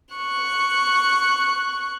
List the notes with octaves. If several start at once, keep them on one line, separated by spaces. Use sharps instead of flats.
C#6 F#6